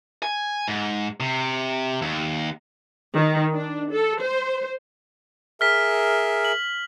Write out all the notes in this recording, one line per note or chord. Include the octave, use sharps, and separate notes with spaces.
G#5
G#2
C3
D#2
D#3
D4
A4
C5
G#4 A#4 E5 F6 B6
F#7